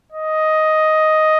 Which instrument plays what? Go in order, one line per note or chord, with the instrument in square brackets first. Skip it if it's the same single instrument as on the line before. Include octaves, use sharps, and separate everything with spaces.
[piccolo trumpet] D#5